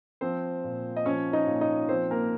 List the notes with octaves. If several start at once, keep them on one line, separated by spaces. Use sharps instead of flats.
F3 C4 C5
A#2
D#5
F3 C#4 C#5
D#4 D#5
A#2
D#4 D#5
F3 C4 C5
A#3 A#4